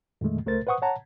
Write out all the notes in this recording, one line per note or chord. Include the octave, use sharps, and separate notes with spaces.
F2 A#2 D#3 G#3 A3
C#2 A3 A#4 C5 A6
B4 C5 F#5 C#6 D#6
C#5 F#5 A5 A#5